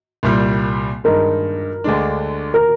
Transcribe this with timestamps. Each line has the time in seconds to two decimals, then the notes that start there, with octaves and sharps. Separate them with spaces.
0.23 C2 A#2 G3
1.04 G2 D#3 G#3 D#4 A#4
1.84 D2 D3 G#3 D4
2.54 A#4